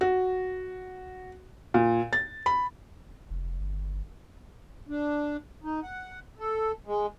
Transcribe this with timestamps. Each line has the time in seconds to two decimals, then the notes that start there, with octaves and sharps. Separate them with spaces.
0.01 F#4
1.74 A#2
2.13 A6
2.46 B5
3.30 F1
3.60 G1
4.89 D4
5.64 D#4
5.83 F#5
6.39 A4
6.86 G#3